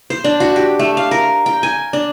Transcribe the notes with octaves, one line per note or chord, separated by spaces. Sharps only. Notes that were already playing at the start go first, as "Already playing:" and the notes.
C5
D4
F#4
G4
A3
F5
A#4
G5
G#5
D4